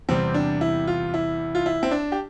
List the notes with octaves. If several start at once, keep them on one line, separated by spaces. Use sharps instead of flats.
E2 C3 G3 C4
D4
E4
F4
E4
F4
E4
C4
D4
G4